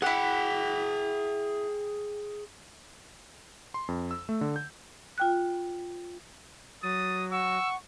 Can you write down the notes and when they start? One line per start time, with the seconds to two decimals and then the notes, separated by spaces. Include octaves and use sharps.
0.02 E4 G#4 F#5 G5
3.74 C6
3.88 F2
4.11 E6
4.29 A3
4.41 D3
4.56 G6
5.18 F4 G5 F#6
6.83 F#3 D#6 A6
7.31 F#5 C#6 E6